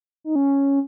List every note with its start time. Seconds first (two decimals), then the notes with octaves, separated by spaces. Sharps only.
0.24 D#4
0.35 C#4